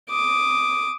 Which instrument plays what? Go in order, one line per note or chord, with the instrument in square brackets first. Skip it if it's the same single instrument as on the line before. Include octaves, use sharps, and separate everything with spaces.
[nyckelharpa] D6 D#6